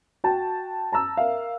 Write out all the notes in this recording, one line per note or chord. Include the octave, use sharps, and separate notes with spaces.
F#4 G5 A5
A5 A#5 E6
A#4 E5 F5